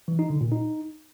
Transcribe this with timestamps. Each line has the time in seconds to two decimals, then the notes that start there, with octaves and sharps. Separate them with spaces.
0.08 E3
0.19 D#4
0.30 D3
0.41 A#2
0.52 D#4